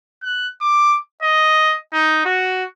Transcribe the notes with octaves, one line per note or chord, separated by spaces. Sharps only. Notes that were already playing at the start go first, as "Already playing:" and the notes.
F#6
D6
D#5
D#4
F#4